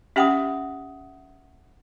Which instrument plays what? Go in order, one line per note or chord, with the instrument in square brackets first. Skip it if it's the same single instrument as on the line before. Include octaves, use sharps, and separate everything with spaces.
[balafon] C#4 G4 G5 [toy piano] E5 F#5 D#6